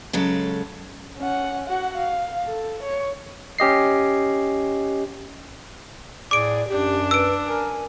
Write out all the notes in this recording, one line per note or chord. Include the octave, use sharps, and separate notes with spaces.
C#3 F#3 G#3 A4
C#4 F#5
F#4 F#5
F5
A4
C#5
C#4 G4 D#5 C7
A2 G#4 D5 D6 D7
F#2 D4 G4
B4 E6 D7
A#4 G#5